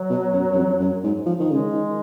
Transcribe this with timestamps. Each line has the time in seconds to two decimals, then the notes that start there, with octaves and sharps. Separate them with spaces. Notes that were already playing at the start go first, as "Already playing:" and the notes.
Already playing: F#3
0.10 B2
0.33 F#2
0.52 F#2
0.56 F2
0.79 F#2
1.03 G#2
1.26 F3
1.39 D#3
1.50 C#3 G#3
1.73 D#3